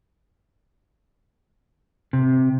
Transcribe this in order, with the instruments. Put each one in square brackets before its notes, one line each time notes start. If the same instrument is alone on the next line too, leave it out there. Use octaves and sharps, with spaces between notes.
[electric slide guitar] C3